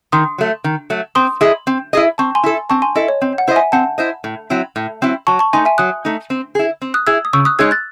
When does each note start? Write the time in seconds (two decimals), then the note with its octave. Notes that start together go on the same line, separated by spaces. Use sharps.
0.12 D#3 C6 D#6
0.38 F#3 A3
0.64 D#3
0.90 F#3 A3
1.15 C4 C6 D#6
1.41 E4 G#4 D#5
1.67 C4
1.93 E4 G#4 D#5
2.18 C4 A5 C#6
2.35 G#5 C6
2.43 E4 A4
2.70 C4 A5 C#6
2.82 G#5 C6
2.95 E4 A4 D#5
3.08 C#5
3.22 C4
3.38 F#5
3.48 E4 C5 D#5
3.56 E5 G#5
3.72 C4 F#5 A5
3.98 E4 C5 D#5
4.24 A2
4.50 F#3 C4 E4
4.76 A2
5.02 F#3 C4 E4
5.27 F#3 A5 C#6
5.39 A5 C#6
5.53 A3 D#4 G#5 C6
5.65 E5 G#5
5.78 F#3 D#6 F#6
6.05 A3 D#4
6.30 C4
6.55 E4 G#4
6.82 C4
6.94 D#6 F#6
7.07 E4 G#4 E6 G#6
7.25 D#6
7.33 C#3 C#6 E6
7.45 D#6 F#6
7.59 G#3 D#4 G#4 C#5 E6 G#6
7.71 F#6 A6